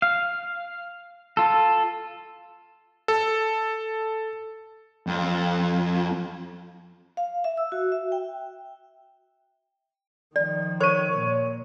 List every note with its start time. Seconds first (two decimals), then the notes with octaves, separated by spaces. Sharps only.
0.02 F5
1.37 F4 A4
3.08 A4
5.07 F2
7.17 F5
7.44 E5
7.57 E6
7.72 F#4
7.92 E5
8.12 G5
10.36 D#3 F3 D5
10.80 A#4 C5 C#5 C#6 D#7
11.11 A#2